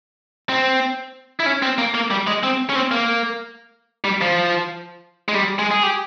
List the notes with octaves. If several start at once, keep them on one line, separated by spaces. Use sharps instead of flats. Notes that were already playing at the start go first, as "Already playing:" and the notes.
C4
E4
C#4
C4
A#3
A#3
G3
G#3
C4
C#4
C4
A#3
G3
F3
G#3
G3
G#3
G#4
G4